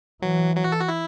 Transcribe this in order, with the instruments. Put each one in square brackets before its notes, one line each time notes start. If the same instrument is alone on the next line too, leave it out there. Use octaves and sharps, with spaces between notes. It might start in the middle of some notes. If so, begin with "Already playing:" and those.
[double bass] E3 [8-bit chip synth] F#3
[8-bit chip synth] F#3
F#4
A4
F#4
E4